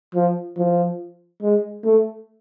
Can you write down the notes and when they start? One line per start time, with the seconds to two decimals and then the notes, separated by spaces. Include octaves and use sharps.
0.15 F3
0.57 F3
1.42 G#3
1.84 A3